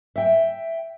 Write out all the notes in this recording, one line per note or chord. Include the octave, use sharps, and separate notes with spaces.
E5 G5